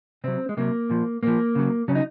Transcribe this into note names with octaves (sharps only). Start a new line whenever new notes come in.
C3 F#3 C4
G#3
C3 F#3 A#3
A#2 F3
A#2 F3 A#3
C#3 F#3
C#3 F#3 C#4
D#4